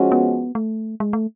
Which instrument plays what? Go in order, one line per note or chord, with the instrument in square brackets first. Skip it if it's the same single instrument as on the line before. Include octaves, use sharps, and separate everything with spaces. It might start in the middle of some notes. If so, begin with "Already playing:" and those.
Already playing: [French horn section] F3 G#3 C#4 F#4
[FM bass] B3
A3
G#3
A3